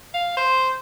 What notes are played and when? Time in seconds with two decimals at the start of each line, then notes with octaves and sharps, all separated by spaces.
0.14 F5
0.37 C5